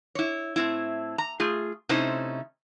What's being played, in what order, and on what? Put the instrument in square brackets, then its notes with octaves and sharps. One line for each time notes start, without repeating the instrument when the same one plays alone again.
[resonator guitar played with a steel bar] E4 C#5
A2 C4 E4
A#5
A3 F4 G#4
C3 A3 C#4 D#4 E4 C5